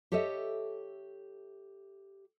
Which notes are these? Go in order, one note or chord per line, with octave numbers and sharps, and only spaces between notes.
G4 A4 C#5 D#5 E5